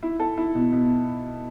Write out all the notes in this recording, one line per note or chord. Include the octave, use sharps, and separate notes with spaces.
E4
A4
E4
B2
B2